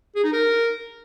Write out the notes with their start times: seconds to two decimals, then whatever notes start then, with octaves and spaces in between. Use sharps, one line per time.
0.16 G#4
0.24 D#4
0.33 A#4